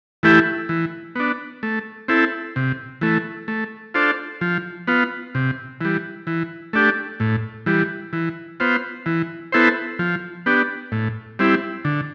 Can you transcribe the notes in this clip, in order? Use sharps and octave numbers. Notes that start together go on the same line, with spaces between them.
E3 A3 E4 G4
E3
B3 D4
A3
C4 E4 A4
C3
E3 A3
A3
D4 F4 A4 C5
F3
B3 F4
C3
E3 G3
E3
A3 D4 G4
A2
E3 G3
E3
B3 F4 C5
E3
B3 E4 A4 C5
F3
B3 D4 G4
A2
G3 C4 E4
D3